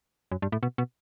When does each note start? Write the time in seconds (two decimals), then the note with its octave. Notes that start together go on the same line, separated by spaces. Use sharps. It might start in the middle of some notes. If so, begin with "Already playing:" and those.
0.32 F#2
0.42 G2
0.52 A2
0.63 B2
0.78 B2